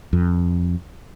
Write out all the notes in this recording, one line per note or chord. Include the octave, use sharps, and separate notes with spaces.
F2